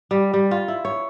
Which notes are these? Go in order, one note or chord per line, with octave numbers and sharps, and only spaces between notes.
G3
G3
F4
E4
C#5